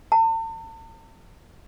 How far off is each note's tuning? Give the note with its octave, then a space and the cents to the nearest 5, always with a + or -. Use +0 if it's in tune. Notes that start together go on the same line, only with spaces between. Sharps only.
A5 +45